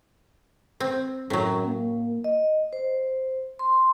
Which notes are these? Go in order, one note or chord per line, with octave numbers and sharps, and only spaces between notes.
C4
F#2 A2 F#3
A#3
D#5
C5
C6